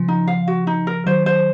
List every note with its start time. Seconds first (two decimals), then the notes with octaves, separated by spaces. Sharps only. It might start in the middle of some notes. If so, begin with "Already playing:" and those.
Already playing: C#3 F3
0.08 D#4
0.28 F5
0.48 F#4
0.67 D#4
0.87 A#4
1.06 D#3 F#3 C5
1.26 C5